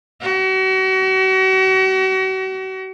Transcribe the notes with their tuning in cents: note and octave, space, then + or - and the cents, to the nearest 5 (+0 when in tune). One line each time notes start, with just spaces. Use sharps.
F#4 +40